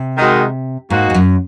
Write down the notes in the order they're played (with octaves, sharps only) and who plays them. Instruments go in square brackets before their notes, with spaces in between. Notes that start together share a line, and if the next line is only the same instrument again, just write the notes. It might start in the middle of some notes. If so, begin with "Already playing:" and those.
Already playing: [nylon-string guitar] C3
[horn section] D#3 G#3 D#4 F#4 A#4
[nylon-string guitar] G#2 [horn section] A#3 D#4 F#4
[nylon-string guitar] G#2
F#2